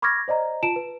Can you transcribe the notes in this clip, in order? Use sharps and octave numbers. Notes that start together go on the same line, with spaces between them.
B5 C#6 D6 F6 G#6 A#6
C5 D5 D#5 A#5
F4 A5 D7 E7
B4